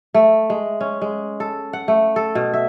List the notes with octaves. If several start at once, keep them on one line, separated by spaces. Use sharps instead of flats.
A3
G#3
C#4
G#3
A4
F#5
A3
A4
B2
E5